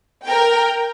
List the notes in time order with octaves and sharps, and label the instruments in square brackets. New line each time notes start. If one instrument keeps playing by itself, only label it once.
[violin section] A#4 G5